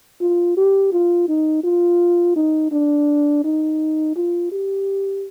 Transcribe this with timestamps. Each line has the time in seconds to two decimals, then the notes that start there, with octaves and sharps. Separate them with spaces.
0.21 F4
0.57 G4
0.92 F4
1.28 D#4
1.64 F4
2.36 D#4
2.72 D4
3.44 D#4
4.16 F4
4.52 G4